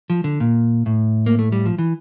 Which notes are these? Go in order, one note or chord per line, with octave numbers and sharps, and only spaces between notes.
F3
D3
A#2
A2
A#3
A3
G3
F3
E3